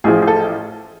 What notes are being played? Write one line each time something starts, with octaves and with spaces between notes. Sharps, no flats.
A1 A2 F3 G#4
G#4
A4